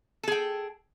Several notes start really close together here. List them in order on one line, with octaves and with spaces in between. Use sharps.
A4 G#4 G5